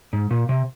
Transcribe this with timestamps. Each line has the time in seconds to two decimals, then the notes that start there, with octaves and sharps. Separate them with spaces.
0.13 G#2
0.31 A#2
0.49 C3